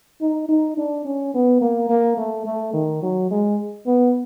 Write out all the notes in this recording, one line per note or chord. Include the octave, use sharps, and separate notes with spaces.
D#4
D#4
D4
C#4
B3
A#3
A#3
A3
A3
D#3
F#3
G#3
B3